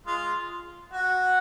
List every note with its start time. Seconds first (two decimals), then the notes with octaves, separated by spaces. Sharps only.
0.06 G#3 F4
0.93 F#4